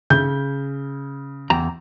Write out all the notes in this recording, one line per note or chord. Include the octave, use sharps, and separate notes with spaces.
C#3 G6
E2 G5 A#5